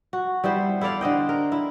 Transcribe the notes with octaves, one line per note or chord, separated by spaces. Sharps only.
F#4
G3 B3 E4 C5
E4 A4 D5 F5
D3 C5 D#5 G5
A#4
E4